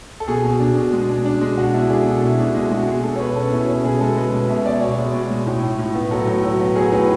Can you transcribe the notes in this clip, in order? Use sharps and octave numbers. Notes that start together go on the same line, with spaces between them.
A4
B2 G#4
B2
D4
B2
G#3
D4
D4
G#3
B2 F#4
D4 E4
D4 G#4
B2 A4
B2 E4
B2 D4
G#3 E4
G#3 F#4
B2 G#4
B2 A4
C#5
B2 B4
C#4 A4
B2 E4
C#4
B2 G#4
G#3 A4
G#3 B4
B2
B2 E5
B2 D5
B2 C#5
G#3
B2
G#3
A2
A2
A2
B3
F#3 A4
A2
F#3
B3
F#3 G#4
A2 B4